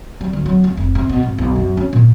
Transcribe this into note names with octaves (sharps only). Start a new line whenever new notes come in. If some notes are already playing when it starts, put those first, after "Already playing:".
G3
D2
F#3
C#2
F1
C3
B2
G#1
B1
F#2
C#4
A#2